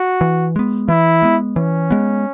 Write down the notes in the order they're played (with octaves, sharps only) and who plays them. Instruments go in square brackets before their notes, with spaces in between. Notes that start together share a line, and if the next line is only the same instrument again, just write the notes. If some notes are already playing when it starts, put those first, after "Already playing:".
Already playing: [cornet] F#4
[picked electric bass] E3
G#3 B3
[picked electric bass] E3 [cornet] E4
[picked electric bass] G#3 B3
[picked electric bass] E3 [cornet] C#4
[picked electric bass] G#3 B3